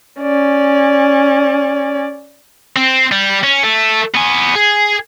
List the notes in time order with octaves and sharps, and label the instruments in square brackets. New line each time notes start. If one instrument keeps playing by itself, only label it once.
[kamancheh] C#4 D5
[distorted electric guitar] C4
G3
C#4
A3
B3 G#5
G#4